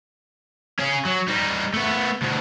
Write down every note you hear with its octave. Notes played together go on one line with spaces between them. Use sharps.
C#4 G#4
F#3
G3 D#4
A3 B3
D2 B2